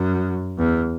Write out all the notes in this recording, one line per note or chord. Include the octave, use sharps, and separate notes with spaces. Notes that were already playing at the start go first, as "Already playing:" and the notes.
Already playing: F#2
E2